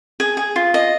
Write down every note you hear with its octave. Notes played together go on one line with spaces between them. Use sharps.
G#4
G#4
F4
D#5